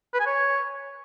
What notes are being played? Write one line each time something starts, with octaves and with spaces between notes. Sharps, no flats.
B4
G#5
C#5